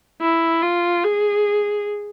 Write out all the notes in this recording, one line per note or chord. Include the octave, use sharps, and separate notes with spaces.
E4
F4
G#4